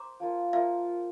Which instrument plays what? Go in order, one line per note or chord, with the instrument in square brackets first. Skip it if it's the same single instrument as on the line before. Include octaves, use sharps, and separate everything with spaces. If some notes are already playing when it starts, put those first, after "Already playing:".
Already playing: [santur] C5 [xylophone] A#5 D6
[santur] F3 A#3 F4
[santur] F3 A#3 F4 [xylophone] E5